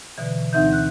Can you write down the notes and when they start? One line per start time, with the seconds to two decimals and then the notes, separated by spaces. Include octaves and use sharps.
0.18 B2 D3 E3
0.53 D2 E3 C4 D#4 E5 G6
0.73 F#6